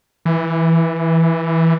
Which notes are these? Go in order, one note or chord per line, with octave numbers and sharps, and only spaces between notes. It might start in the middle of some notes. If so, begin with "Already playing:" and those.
E3